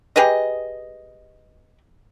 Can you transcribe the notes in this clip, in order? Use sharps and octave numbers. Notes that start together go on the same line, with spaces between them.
G4 G#4 B4 D#5